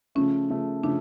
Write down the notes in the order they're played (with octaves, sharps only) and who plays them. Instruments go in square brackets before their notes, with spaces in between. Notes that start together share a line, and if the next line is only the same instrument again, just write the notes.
[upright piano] C#3 F3 A3 [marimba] C#4
[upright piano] C#3 F3 A3
[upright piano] C#3 F3 A3 [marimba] D4